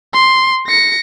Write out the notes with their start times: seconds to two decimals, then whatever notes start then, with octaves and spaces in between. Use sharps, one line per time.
0.13 C6
0.67 A#6 C#7